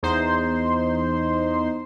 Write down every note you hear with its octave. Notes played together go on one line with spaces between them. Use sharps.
E2 D#4 C5 C6